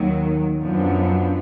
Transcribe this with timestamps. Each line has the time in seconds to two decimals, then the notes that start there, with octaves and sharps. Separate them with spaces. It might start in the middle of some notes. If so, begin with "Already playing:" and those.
Already playing: D#2 D#3 F#3
0.61 F#2 F3 B3 D4